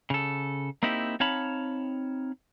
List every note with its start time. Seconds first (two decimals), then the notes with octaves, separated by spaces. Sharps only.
0.10 C#3 A4
0.83 A#3 C4 D#4 E4 G4
1.20 C4 D#4 C#5 F5 A5 B5